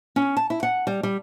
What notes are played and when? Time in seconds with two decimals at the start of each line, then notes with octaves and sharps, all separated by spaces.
0.16 C#4
0.37 A5
0.50 E4
0.63 F#5
0.87 G3
1.03 G3